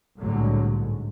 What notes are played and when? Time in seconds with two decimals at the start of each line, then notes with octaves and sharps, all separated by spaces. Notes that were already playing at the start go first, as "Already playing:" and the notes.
0.19 C2 A2 D3 F#3 G#3
0.76 G#2